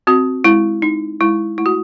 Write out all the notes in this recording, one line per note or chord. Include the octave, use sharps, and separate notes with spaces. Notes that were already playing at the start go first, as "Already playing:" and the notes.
C4 F#4
G#3 E4
D#4
G#3 E4
A3 E4
F#4